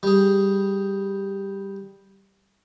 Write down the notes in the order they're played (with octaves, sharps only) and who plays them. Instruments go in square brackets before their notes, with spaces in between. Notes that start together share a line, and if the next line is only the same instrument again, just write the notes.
[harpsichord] G3 G#4